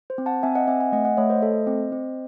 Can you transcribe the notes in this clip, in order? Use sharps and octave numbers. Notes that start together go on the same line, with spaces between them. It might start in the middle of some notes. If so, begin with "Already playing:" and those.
C5
C4
F#5 A5
C4 E5 G#5
D#5 F#5
C4 E5 G#5
E5 G#5
A3 D#5 F#5
D#5 F#5
A3 C#5 E5
C5 D#5
A4
C4
C4